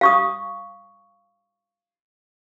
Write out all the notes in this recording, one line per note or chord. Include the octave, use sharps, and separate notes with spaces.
F5 C#6 D#6